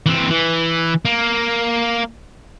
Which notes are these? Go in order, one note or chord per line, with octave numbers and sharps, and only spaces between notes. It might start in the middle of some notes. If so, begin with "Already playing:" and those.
E3 C4
E3
A#3